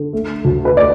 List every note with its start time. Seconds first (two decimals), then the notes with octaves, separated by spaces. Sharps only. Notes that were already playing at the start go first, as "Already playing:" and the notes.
Already playing: D3
0.13 A3
0.45 D2
0.65 B4
0.77 A3 D5